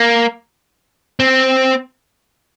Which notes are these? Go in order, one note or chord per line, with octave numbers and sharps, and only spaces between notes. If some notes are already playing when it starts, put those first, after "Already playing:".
Already playing: A#3
C4